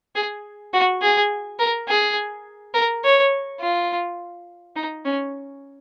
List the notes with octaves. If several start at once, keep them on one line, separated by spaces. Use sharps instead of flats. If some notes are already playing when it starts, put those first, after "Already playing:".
G#4
F#4
G#4
A#4
G#4
A#4
C#5
F4
D#4
C#4